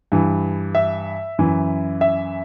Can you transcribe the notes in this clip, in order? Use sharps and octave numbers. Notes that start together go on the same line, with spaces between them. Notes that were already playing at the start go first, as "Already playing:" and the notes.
G2 E3
E5
F#2 E3
E5